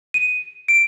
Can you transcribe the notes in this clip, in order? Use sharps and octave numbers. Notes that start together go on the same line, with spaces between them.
D#7
D7